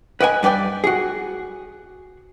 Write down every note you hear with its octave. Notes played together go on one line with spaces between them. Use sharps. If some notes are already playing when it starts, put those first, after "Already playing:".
B4 D#5 G5 G#5
G2 B4 D5 G5
F#4 G#4